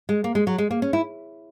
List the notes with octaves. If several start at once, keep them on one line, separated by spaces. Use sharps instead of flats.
G#3
A#3
G#3
F#3
G#3
A#3
C#4
E4